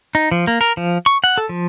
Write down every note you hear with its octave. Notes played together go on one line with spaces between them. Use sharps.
D#4
F3
A#3
A#4
F3
C#6
F#5
A4
F3